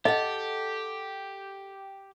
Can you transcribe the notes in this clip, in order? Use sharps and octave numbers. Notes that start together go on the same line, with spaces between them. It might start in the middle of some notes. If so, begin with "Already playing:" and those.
G4 A4 D#5 F#5